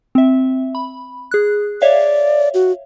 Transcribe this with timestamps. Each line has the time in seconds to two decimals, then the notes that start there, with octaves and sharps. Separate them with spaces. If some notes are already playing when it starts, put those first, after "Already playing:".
0.15 C4 E5
0.75 B5
1.31 G#4 F#6
1.82 C#5 D5 E5 F5
2.54 F#4